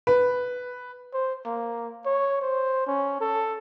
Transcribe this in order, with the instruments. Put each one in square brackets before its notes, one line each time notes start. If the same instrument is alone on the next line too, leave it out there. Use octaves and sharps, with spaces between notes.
[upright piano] B4
[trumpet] C5
A#3
C#5
C5
C#4
A4